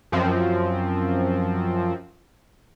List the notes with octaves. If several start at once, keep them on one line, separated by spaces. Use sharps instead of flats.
F#2 F3 C4